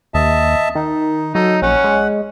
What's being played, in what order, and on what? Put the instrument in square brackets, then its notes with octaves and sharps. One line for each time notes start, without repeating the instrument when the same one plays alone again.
[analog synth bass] D#2 [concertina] D#5 E5 A5
[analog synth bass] D#3 [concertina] D#4
[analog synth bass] F#3 [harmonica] D#4 [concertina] A4
[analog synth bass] A#1 [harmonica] C#4 [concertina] F#5
[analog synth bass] G#3